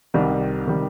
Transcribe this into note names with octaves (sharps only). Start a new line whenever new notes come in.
C2 C3 D#3 G3
C3 D#3 G3